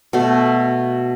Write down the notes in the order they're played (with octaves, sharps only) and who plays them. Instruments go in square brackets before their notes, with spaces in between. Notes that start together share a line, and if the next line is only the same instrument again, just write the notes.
[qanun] B2 A3